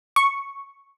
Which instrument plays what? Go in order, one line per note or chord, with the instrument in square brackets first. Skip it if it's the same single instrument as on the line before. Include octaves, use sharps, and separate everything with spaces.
[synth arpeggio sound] C#6